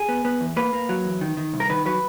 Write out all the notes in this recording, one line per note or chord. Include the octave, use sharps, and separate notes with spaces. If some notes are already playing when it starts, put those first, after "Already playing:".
Already playing: G#4
B3
B3
E2
A#3 B4
A#3
F#3
E2
D#3
D#3
C2
A#4
D#3 B4
F#3 B4